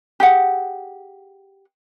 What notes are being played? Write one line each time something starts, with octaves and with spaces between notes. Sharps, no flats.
G4 G#4 F#5